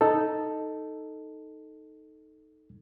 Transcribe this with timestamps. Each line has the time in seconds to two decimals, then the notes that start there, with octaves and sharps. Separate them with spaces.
0.01 D#4 A4